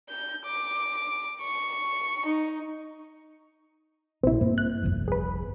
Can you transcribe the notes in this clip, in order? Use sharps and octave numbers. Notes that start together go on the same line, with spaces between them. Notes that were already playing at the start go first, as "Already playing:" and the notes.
G6
D6
C#6
D#4
A#1 C3 C4 E4
G2 A#3
F#6
G1 C2 F2
G#4 B4